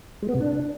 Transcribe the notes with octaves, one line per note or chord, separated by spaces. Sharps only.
G#3
B3
C3
D4